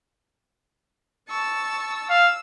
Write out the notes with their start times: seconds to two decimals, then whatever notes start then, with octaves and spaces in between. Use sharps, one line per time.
1.28 A5 C#6 E6
2.10 F5 E6